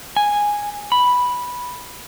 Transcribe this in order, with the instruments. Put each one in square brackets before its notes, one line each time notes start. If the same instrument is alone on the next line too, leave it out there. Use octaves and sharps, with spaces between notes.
[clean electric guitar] G#5
B5